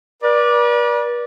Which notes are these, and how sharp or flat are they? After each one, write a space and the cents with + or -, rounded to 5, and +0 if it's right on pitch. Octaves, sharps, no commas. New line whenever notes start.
B4 -45 D5 +0